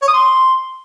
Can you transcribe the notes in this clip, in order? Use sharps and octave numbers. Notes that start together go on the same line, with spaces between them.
C#5
D#6
C6